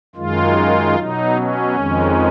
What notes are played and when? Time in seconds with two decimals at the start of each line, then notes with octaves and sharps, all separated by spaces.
0.16 F#2 D#3 G#3 F4
0.96 B2 F#3 D#4
1.35 C#4
1.74 F2 D#3 G#3